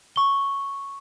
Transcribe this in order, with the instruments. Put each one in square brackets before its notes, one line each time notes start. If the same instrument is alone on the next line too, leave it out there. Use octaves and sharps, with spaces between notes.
[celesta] C#6 G7